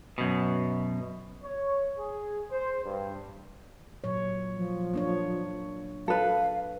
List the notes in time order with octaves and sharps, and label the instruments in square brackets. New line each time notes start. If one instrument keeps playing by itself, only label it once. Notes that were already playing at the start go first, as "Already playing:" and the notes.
[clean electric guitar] F#2 B2
[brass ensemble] C#5
G#4
C5
G2
[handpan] A#2 F#3 C#5
[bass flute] F3
[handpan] A#3 D4 C#5
[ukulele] A4 B4 [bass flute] F5